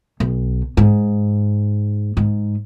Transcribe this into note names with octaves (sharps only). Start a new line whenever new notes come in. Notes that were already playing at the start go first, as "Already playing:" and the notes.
B1
G#2
G#2